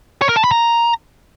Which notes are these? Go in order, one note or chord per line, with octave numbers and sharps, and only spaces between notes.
C#5
A#4
A5
B5
A#5